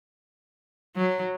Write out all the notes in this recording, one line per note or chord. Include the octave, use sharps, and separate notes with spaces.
F#3